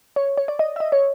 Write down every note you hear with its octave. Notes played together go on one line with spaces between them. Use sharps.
C#5
C#5
D5
D#5
E5
D#5
C#5